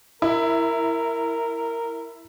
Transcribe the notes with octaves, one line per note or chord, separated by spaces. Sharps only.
E4 A#4